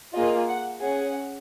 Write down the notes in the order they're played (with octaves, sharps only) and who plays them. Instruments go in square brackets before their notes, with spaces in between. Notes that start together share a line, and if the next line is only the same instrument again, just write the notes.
[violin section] A#3 F4 G#4 D#5
F#5
C#4 G#4 F#5